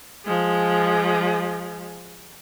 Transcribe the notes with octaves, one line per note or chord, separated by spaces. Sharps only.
F3 G#3